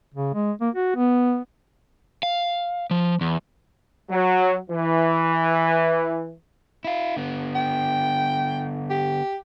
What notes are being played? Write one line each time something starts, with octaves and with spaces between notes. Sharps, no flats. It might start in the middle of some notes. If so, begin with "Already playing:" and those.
C#3
G#3
A#3
F#4
B3
F5
F3
E2
F#3
E3
E4 F5
D3 B3
G5
G4